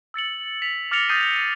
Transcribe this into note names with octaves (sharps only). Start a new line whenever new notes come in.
E6 A6 C#7 F#7
B6 F7
D6 F6 A6 A#6 C#7 F7
D#6 G6 A6 A#6 C7 D#7